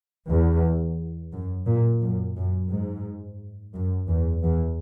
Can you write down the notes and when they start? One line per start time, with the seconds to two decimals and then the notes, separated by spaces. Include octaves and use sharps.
0.28 E2
1.32 F#2
1.67 A#2
2.02 F#2
2.36 F#2
2.70 G#2
3.74 F#2
4.09 E2
4.43 E2